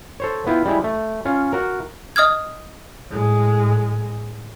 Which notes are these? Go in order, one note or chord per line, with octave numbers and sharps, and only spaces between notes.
A4 C5 C#5
B3 E4 F4 G5
G3 G#3 E4
A3
C#4 F4
F#4 A#4
D#5 D#6 F6 G#6
A2 G#3